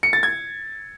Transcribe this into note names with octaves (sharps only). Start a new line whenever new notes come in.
C#7
A6
G#6